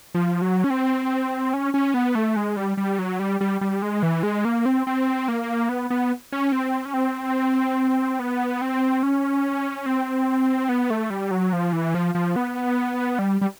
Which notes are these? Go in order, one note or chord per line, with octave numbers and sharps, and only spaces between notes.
F3
F#3
C#4
C4
C#4
C#4
B3
A3
G#3
G3
G3
F#3
G3
G3
G3
G#3
E3
G#3
A#3
C4
C4
A#3
B3
B3
C#4
C4
C#4
C4
B3
C4
C#4
C4
B3
A3
G3
F#3
F3
E3
F3
F3
B3
G3
G3